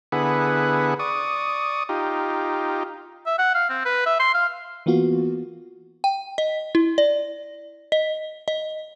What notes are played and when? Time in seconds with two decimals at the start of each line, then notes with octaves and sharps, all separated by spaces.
0.12 D3 B3 E4 G#4 B4 F#5
0.99 D5 C#6 D#6
1.89 D#4 F4 G4
3.26 E5
3.39 F#5
3.55 F5
3.70 C4
3.85 B4
4.06 E5
4.20 C6
4.35 F5
4.86 E3 A#3 B3 F4 F#4
6.04 G5
6.38 D#5
6.75 E4
6.98 D5
7.92 D#5
8.48 D#5